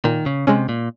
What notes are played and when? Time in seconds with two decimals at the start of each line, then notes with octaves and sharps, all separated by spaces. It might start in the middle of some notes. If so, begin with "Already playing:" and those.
0.04 A#2 D#3
0.26 C#3
0.47 C3 G#3 C#4
0.69 A#2